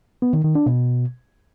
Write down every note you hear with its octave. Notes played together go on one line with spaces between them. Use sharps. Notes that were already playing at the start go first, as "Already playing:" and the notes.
B3
D#3
D#3
D4
B2